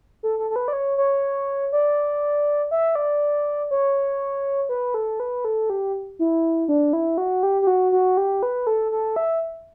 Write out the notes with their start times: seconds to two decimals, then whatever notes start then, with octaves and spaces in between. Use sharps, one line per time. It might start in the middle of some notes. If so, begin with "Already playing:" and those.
0.23 A4
0.39 A4
0.51 A4
0.56 B4
0.68 D5
0.73 C#5
0.98 C#5
1.73 D5
2.71 E5
2.95 D5
3.71 C#5
4.69 B4
4.94 A4
5.20 B4
5.45 A4
5.70 G4
6.19 E4
6.68 D4
6.93 E4
7.18 F#4
7.43 G4
7.62 G4
7.67 F#4
7.92 F#4
8.17 G4
8.43 B4
8.67 A4
8.92 A4
9.16 E5